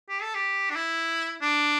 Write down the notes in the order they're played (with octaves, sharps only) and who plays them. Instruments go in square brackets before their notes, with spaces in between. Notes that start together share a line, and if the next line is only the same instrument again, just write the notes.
[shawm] G4
A4
G4
D4
E4
D4